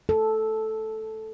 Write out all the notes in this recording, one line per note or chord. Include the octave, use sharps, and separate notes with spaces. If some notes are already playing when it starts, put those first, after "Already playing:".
A4